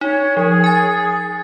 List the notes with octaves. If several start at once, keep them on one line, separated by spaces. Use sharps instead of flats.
D#4 C#5
F3 G#4
G#5 A6